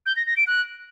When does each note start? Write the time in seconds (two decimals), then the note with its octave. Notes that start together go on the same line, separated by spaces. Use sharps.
0.06 G6
0.16 A#6
0.27 A#6
0.37 D7
0.47 F#6